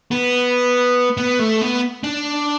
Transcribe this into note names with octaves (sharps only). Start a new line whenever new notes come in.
B3
B3
A3
B3
D4